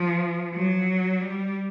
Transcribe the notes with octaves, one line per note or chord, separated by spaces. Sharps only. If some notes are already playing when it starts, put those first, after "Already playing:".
Already playing: F3
F#3
G3